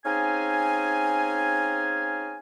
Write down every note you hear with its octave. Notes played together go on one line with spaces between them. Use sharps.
C4 C#4 D#4 G#4 F5 G#5